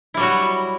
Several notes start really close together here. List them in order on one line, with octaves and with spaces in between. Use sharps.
E4 G3 F#3 F#4